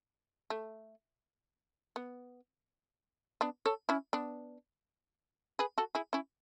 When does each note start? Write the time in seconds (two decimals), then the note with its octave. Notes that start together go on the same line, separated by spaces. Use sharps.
0.50 A3
1.96 B3
3.41 B3 D4
3.66 A4 C#5
3.89 C#4 E4
4.13 B3 D4
5.59 G#4 B4
5.78 F#4 A4
5.95 E4 G#4
6.13 C#4 E4